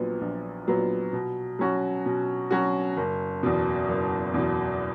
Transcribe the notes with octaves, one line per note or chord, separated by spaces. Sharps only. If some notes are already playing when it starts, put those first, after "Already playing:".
Already playing: A#1 A#2 F#3 B3
A#1
A#2 F#3 B3
B2
F#3 C#4 F#4
B2
F#3 C#4 F#4
F#1
E2 B2
F#1
E2 B2